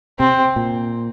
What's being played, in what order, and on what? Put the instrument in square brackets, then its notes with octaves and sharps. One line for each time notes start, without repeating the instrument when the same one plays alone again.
[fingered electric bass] C3 [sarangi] C4
[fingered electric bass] A#2